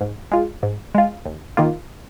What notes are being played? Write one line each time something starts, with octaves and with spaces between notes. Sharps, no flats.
G#2
G#3 F4
G#2
G#3 F4
D#2
D#3 A#3 F4